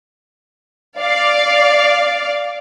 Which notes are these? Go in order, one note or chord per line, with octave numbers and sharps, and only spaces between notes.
D5 F5